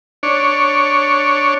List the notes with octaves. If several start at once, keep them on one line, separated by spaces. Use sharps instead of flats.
D4 C#5